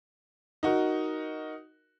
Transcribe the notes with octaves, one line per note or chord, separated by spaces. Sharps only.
D#4 F#4 A#4